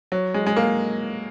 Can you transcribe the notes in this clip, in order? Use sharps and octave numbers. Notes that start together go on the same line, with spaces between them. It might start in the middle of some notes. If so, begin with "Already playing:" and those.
F#3
G#3
G#3
A#3